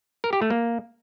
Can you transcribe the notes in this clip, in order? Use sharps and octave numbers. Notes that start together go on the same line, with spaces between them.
A#4
G4
A3
A#3